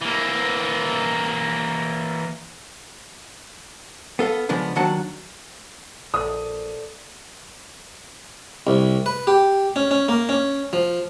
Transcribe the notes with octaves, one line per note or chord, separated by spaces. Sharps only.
E3 A#3
B3 A4 F5
C#3 F3 G#3 B3 D4
D#2 D#3 F#3 D4 F#5 A5
A#1 A4 D5 D#6
C2
B4
G4
C#4
C#4
A#3
C#4
F3